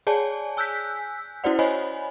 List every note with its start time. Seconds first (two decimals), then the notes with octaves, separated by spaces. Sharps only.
0.07 G#4 C#5 D5 G#5 A5
0.57 G#5 E6 F#6 G6 B6
1.44 C#4 E4 F#4 C5 D5 F#5
1.59 C5 C#5 D#5 G#5 B5